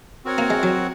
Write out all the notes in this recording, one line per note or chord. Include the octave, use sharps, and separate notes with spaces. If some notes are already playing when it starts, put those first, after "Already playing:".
C4 F#4 A#4 C#5 F#5
A#3
G#3
F#3